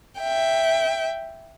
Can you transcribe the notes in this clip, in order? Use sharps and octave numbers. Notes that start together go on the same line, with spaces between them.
E5 G5